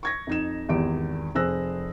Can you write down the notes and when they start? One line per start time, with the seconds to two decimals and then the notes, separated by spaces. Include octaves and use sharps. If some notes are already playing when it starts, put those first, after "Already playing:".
0.03 C#6 G#6 A#6
0.27 F2 D#4 E7
0.69 G#1 E2 G4 D7
1.35 F1 C4 G#4 E6 F#6 A#6